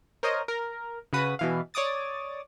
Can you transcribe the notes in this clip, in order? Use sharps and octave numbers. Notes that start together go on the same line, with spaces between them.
A#4 C5 C#5 D#5
A#4
C#3 F#4 B4 D#6
B2 E3 F5
C#5 D5 D6 D#6 A6